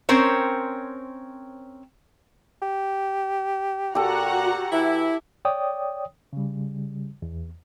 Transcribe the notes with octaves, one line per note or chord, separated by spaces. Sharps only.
C4 C#4 A#4 C5 C#5
G4
A#2 F#4 G4 A4 F#5 A#5
E3 E4
C#5 D5 G5 D#6
C#3 G3
E2